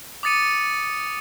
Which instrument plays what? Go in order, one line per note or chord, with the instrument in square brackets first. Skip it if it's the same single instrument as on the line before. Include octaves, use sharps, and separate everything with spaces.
[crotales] D6 D#6 A6 C#7 D#7